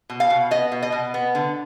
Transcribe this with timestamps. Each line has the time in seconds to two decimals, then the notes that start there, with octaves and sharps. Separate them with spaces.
0.10 B2
0.20 F5
0.30 B2
0.51 B3 D#5
0.72 B2
0.82 D#5
0.92 B2
1.14 B3
1.35 D3